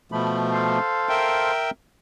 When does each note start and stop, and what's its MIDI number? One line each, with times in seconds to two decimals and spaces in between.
0.12 0.79 47
0.12 0.79 53
0.12 0.79 57
0.12 0.38 83
0.53 1.52 69
0.53 1.52 72
0.53 1.52 77
1.09 1.71 70
1.09 1.71 76
1.09 1.71 79